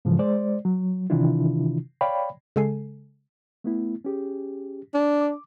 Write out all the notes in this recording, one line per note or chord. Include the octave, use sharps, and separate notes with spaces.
G#2 C#3 E3 F3
G#3 C5 D5
F#3
C3 D#3 E3 D4 E4 F4
C#5 D5 F5 G5 B5
C#3 G#3 A4 G#5 C7
A3 B3 E4
C#4 G4 G#4
D4
D6